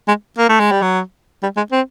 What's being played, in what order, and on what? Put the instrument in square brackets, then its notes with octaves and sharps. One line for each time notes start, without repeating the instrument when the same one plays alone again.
[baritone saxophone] G#3
A#3
A3
G#3
G3
F#3
G3
G#3
C4